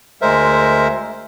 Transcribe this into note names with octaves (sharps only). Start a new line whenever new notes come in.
D2 G#3 A#4 C5 E5